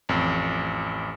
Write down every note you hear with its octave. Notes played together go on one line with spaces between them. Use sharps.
A1 F2